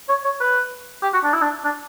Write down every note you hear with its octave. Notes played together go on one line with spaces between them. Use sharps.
C#5
C#5
B4
G4
F#4
D4
E4
D4
D4